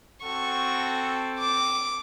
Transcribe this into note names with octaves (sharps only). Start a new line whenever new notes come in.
C4 F#4 A4 C#6
D6